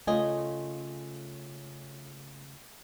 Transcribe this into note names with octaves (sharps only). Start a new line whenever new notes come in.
C#3 A3 F4 D#5 G#5